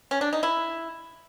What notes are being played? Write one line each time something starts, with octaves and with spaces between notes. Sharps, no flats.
C#4
D4
D#4
E4